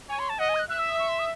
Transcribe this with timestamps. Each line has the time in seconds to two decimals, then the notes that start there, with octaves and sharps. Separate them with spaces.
0.09 C#5 G#5
0.19 C6
0.29 A5
0.39 D#5 F#5
0.49 G#5
0.55 G#6
0.59 F#6
0.69 E5 F#6
0.79 E6
0.89 D#6
0.99 C#6
1.09 C6
1.19 D#6